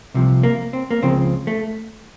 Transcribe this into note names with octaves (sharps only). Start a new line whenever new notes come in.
C2 C3 F3
A#3
C4
A#3
C#2 C#3 F3 C4
A3